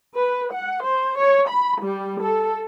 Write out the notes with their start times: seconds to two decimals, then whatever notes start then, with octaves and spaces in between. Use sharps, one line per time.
0.15 B4
0.52 F#5
0.83 C5
1.18 C#5
1.49 B5
1.82 G3
2.21 A4